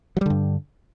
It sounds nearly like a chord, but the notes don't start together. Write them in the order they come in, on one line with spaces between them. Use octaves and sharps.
F#3 G3 D3 G2